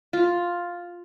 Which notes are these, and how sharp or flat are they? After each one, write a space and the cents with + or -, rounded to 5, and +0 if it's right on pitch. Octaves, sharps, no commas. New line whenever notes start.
F4 +5